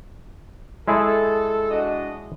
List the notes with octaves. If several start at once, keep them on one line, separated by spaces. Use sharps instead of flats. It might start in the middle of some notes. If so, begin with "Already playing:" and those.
G#3 E4 G#4 A4
D4 F#4 D#5